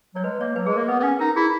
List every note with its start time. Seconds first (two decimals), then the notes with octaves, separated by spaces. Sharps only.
0.15 F#3 C#5
0.24 G#3 B4
0.40 A#3 C#5
0.56 F#3 B4
0.66 G#3 G#4
0.73 A#3 A#4
0.88 B3 B4
1.00 B3
1.03 C#4
1.19 D#4 A#4
1.36 E4 G#4